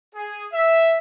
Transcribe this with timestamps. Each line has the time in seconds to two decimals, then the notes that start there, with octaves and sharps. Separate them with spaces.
0.15 G#4
0.53 E5